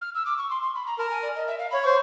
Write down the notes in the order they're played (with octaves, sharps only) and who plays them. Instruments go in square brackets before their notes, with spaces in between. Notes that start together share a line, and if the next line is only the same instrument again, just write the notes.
[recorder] F6
E6
D6
C#6
C6
C6
B5
A#5
[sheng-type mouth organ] A#4 [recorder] A5
[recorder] G#5
D5
D#5
E5
F5
[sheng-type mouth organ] C#5 [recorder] B5
[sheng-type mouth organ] C5 [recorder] C#6